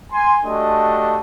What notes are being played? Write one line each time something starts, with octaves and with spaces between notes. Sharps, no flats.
G#5 C6
A3 D4 F#4 G4 D#5